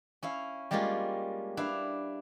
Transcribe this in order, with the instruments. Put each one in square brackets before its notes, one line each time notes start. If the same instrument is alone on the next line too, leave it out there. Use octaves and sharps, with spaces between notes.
[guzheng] C#4 E4 F5
G3 G#3 A#3 C#4 F4
D4 E4 B4 F5